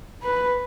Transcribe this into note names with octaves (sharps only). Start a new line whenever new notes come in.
B4